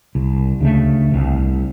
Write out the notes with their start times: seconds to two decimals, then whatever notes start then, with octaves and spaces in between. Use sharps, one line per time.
0.15 C2
0.60 D2 C#3 A3
1.11 C2 C3